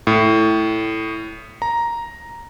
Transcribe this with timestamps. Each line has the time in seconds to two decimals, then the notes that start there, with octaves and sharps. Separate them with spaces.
0.07 A2
1.62 A#5